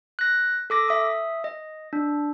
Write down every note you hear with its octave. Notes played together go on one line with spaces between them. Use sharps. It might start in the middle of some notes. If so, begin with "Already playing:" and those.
F#6 A#6
A4 D6 A#6
E5 D#6
D#5
D4